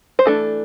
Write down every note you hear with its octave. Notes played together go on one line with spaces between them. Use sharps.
C5
E3 A3 D4 A4